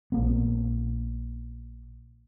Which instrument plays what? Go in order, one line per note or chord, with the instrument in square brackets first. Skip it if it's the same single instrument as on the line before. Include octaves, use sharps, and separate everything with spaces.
[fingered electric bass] A#1 A#3 B3